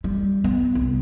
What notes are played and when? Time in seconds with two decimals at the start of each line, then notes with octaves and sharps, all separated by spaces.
0.04 G3
0.44 B3
0.75 C2